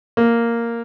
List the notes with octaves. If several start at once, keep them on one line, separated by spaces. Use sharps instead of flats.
A#3